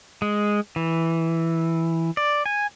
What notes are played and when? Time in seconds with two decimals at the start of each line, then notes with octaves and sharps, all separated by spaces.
0.22 G#3
0.76 E3
2.17 D5
2.46 G#5